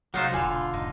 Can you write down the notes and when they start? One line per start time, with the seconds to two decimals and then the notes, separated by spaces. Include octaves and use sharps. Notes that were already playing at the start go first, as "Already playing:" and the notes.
0.14 C2 F#3 D#4 F4 C5 F5 F#5
0.32 E1 B2 D3 F4 B4 G#5
0.74 E1 G#2 D#4